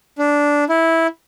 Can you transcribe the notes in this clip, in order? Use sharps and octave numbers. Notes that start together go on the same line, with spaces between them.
D4
E4